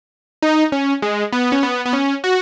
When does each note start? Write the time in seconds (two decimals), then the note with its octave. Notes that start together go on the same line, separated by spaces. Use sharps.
0.42 D#4
0.72 C#4
1.02 G#3
1.32 B3
1.52 C#4
1.63 B3
1.86 B3
1.93 C#4
2.24 F#4